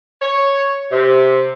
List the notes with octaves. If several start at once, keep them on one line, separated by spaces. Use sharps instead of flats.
C#5
C3